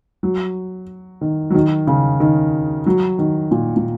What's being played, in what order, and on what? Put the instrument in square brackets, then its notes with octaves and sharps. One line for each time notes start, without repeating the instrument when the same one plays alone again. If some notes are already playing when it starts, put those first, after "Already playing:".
[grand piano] F#3
D#3
F#3
D#3
C#3
D#3
F#3
D#3
A#2
A#2